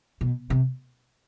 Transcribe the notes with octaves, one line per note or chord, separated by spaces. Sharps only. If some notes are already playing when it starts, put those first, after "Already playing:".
B2
C3